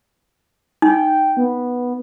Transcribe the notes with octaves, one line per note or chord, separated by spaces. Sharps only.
D#4 G5
B3